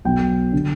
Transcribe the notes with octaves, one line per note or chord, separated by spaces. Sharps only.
B1 B2 G5
D3